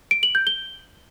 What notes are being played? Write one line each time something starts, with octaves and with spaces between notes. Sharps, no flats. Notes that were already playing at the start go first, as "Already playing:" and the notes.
D7
F#7
G6
G7